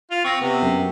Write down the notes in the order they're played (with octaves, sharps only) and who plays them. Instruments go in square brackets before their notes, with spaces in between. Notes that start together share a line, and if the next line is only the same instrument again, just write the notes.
[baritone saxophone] F4
[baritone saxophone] C4 [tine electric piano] C#6 A#6
[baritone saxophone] C3 [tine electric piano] B3
[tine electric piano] F#2